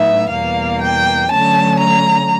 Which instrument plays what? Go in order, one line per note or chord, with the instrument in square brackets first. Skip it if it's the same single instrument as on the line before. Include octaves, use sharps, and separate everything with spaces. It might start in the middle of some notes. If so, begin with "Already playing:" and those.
Already playing: [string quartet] A2 F#3 B3 D#4 E5
E2 B2 G3 A#3 F5
G5
D3 F#3 A3 C#4 A5
A#5